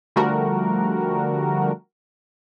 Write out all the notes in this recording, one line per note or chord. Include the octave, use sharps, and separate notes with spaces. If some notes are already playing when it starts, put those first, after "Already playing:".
D3 F3 G3 A3 F#4 A#4